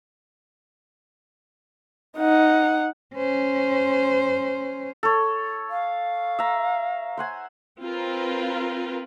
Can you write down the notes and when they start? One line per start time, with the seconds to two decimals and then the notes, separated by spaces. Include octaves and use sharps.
2.18 D#4 F#5
3.15 C#4 C5
5.03 A4 C#5
5.70 F5
6.39 E5 A#5
7.17 C5 F#5 G#5
7.81 C4 F4 A#4 B4